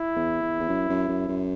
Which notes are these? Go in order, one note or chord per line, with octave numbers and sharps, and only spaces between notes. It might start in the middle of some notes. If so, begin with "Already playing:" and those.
Already playing: E4
E2
E2
E2
F#2
F#2
F#2
F#2